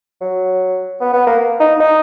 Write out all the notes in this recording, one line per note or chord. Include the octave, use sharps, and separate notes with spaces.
F#3
B3
B3
A#3
D#4
D#4